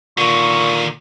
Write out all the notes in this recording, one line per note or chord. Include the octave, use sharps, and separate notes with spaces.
A#2 D3 D#3 C#6